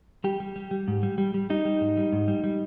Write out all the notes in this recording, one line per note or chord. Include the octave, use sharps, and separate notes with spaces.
G3 G4
G3
G3
G3
G#2
G3
G3
G3
G3 D#4
G3
G#2
G3
G#2
G3
G3